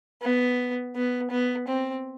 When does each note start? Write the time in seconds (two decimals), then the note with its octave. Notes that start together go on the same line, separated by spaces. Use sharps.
0.22 B3
0.95 B3
1.30 B3
1.68 C4